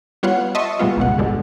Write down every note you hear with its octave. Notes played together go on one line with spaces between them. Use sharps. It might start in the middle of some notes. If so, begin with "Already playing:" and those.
G3 B3 F4 C#5 F5 F#5
D#5 E5 A5 C6 C#6 D#6
A#2 G3 G#3 B3 F4
G#1 C#2 B2 F#5
G2 B2 D3 G#3